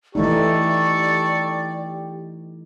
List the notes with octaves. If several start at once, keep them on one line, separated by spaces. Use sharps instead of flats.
E3 A3 D#4 G4 A4 D5 A5 C#6